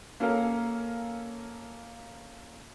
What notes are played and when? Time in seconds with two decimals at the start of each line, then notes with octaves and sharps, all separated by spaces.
0.20 A#3 C#4 A4 A#4 F5